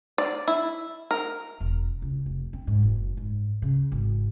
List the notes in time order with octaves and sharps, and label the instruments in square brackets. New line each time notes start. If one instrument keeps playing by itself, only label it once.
[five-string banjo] D5
E4
A#4
[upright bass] E1
C#2
F1
C4
G#2
F#1
G#2
C#3
G#1